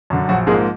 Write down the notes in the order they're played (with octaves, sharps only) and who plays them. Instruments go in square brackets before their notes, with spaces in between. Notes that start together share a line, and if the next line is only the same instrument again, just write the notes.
[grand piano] F#2 D3
A#1 F#3 F#4
G#2 F3 G#3 A#3 G#4